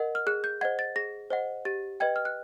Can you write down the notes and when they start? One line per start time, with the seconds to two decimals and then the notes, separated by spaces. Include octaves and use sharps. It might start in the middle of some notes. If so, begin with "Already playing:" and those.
Already playing: A#4 D#5 F#5
0.15 F6
0.27 G#4 F#6
0.44 G6
0.61 C5 D#5 F#5 G#6
0.79 A6
0.96 G#4 A#6
1.30 C5 D#5 F#5
1.65 G4 A6
2.00 B4 D#5 G5 G#6
2.16 F6
2.25 F#6